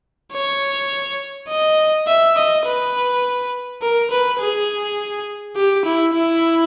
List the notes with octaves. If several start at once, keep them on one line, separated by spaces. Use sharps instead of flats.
C#5
D#5
E5
D#5
B4
A#4
B4
G#4
G4
E4
E4